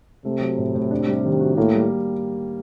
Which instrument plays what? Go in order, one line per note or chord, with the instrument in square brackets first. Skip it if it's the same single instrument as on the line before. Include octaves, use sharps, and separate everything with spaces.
[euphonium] C3 [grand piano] A3
[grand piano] F#3
A2
A2
D4
G3
D#3
F#4
[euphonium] A2 [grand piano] A#3
[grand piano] G3